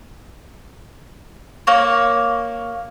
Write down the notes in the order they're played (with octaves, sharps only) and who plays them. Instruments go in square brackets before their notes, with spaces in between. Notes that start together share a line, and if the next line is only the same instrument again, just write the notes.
[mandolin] A#3 C#5